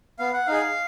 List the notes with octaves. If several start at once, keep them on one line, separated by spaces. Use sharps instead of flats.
B3 F5
F#5
D#4 G#4 F5